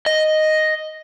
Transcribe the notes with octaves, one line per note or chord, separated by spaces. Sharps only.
D#5